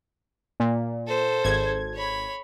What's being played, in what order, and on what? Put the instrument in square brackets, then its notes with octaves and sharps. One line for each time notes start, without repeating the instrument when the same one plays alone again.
[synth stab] A#2
[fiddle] A4 C5
[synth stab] G#1 G#6
[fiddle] C#5 B5